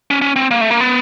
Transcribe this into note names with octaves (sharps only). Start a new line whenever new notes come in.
C#4
C#4
C4
A#3
A3
A#3
B3